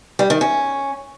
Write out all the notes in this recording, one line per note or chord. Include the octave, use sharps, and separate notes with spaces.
G3
D#3
C#4